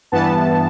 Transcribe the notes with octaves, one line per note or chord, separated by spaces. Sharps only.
G2 E3 B3 A5